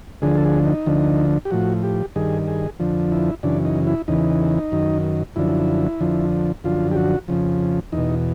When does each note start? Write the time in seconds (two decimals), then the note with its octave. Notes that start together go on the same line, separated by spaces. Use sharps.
0.22 D2 D3 F3 G#4
0.37 A4
0.45 G#4
0.65 D#4
0.86 D2 D3 F3
1.45 G4
1.51 A2 F3 F#4
1.83 G4
2.16 G2 D#3 G#4
2.48 G#4
2.80 F2 D3 F3
3.12 E4
3.43 F#2 C#3 E3 D4
3.65 D#4
3.87 E4
4.08 E2 C#3 E3 D#4
4.72 F#2 D#3
5.36 F#2 D3 F3 E4
6.00 F2 D3 F3
6.64 F#2 D3 F3 F4
6.91 G4
6.96 F#4
7.28 F2 C#3 F3
7.92 E2 B2 D#4